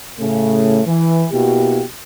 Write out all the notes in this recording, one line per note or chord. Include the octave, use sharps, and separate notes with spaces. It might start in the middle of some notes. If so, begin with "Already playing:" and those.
A2 C#3 A3
E3
B2 A#3 E4 F#4 G4